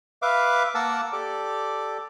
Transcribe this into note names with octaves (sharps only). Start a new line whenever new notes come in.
B4 E5 F5 D6
A#3 A#4 F#5 A5 D6 E6
G4 A4 D5 D6